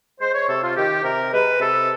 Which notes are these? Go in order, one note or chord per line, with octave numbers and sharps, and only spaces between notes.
G#3 C5
C#5
C3 A4
F4
D#3 G4
C3 A#4
G#3 B4
C3 A4